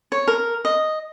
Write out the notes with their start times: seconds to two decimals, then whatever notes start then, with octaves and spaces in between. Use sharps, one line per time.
0.12 C#5
0.28 A#4
0.65 D#5